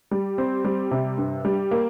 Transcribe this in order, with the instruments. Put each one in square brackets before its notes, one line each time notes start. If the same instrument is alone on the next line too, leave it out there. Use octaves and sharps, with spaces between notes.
[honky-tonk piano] G3
C4
G3
C3
G2
G3
A#3